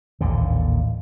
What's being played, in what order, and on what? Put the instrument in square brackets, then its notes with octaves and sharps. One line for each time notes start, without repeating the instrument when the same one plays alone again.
[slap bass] A1 D#2 A#2 D3